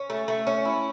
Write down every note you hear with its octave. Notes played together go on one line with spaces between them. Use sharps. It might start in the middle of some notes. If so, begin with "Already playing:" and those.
Already playing: C#4
A3
A3
C#4
E4